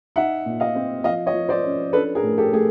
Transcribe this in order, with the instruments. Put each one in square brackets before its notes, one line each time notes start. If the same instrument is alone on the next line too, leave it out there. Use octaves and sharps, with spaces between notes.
[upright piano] D#4 E5 F#5
A#2
D#5 F5
C4
F3 D#5 F5
C#5 D#5
F3
C5 D5
C#4
D4 A4 B4
G#4 A#4
A2
G4 A4
A3 G#4